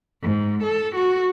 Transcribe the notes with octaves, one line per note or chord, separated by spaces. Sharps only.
G#2
A4
F#4